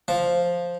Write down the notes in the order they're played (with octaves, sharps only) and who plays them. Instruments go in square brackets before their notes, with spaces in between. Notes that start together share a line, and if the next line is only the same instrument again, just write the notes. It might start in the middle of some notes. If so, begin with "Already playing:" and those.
[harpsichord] F3